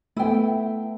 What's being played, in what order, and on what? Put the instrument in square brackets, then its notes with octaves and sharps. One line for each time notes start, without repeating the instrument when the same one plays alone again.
[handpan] A3 B3 [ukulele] E4 G5